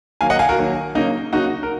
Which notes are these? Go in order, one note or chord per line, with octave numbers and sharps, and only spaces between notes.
D#3 F#3 A#3 F5 G#5
D#5 F#5
F5 G#5
F#4 A#4
D#3 F#3 A#3
C#3 F#3 A#3 D#4
C#3 F#3 A#3 D#4 F#4
A#4